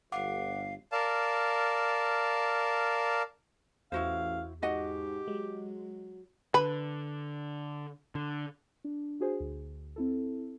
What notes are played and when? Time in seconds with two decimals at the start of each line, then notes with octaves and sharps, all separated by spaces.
0.12 G1 F5 F#5 D6
0.92 A#4 D5 F5 A5
3.92 A1 E2 E4 F#4 C5 F5
4.62 G#2 F#4 G4 D#5 F#5
5.28 F#3 G#3
6.54 D3 B4
8.15 D3
8.84 D4
9.20 D4 F#4 G#4 C5
9.40 D2
9.96 C4 E4 A4